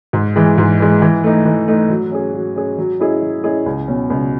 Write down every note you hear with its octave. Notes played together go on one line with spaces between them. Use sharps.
G#2
E3 G#3
G#2
E3 G#3
E3
A3 D#4
E3
A3 D#4
F#3
C#4 G#4
F#3
C#4 G#4
F#3
C#4 E4 G#4 D#5
F#3
C#4 E4 G#4 D#5
C#2
B2 F#3 C#4
C#2